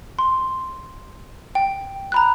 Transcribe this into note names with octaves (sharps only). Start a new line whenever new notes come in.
C6
G5
A#5 B5 F#6